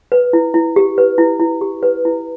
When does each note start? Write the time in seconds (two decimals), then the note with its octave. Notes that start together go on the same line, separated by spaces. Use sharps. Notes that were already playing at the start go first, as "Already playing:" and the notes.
0.12 B4
0.33 E4
0.54 E4
0.76 G4
0.98 B4
1.18 E4
1.40 E4
1.61 G4
1.83 B4
2.05 E4